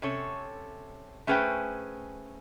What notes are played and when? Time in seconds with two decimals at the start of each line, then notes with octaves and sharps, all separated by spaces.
0.02 C3 C#4 A4 C#5
1.27 A3 C#4 G#4 B4 C5 G5